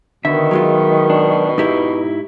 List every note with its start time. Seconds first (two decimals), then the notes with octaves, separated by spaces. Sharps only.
0.25 B2 D3 D#3 E5
0.51 F#3 G#3 F4
1.10 D4
1.58 G#2 D#4 E4 G4 E5